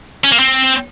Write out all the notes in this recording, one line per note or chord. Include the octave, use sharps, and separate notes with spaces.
C#4
A#3
C4